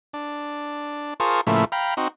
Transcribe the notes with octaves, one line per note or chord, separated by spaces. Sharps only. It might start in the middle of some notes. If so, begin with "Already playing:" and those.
D4
F4 G#4 A#4 C5 A5 C#6
A2 C#3 F3 A3 A#3 E4
F5 G5 A#5 B5
C4 D#4 F#4